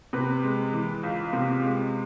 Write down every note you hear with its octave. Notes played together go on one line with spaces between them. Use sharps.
C3 B4
G#3
E3
C#2
C3
G#3